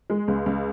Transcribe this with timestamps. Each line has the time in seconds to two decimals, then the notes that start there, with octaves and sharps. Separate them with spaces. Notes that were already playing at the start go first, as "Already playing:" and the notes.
0.10 G#3
0.28 C#2
0.46 C#2